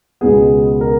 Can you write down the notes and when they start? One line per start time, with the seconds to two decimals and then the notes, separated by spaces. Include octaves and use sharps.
0.21 C#2 B2 G#3 B3 G#4
0.81 A#4